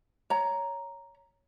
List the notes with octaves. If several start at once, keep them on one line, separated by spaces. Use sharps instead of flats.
C#5 A#5